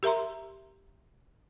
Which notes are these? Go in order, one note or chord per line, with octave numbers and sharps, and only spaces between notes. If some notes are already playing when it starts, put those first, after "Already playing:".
G4 A#4 E5 A#5 C6